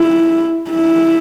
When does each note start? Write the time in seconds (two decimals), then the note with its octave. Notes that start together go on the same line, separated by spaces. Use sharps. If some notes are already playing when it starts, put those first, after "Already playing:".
Already playing: E4
0.70 E4